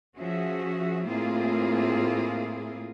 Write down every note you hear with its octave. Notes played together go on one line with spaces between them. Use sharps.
F3 C#4 F#4 G#4 E5
A2 A#3 C4 E4 F4 G#4